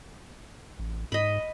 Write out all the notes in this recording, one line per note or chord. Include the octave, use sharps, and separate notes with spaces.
A1
G#2 D#5 B5